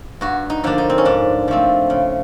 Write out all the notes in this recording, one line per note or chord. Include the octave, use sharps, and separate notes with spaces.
G2 F#4
D#4
D3 F3 A#3 D4
D#4
C4
C#4
G#2 D4
F3 A3 C4
C#3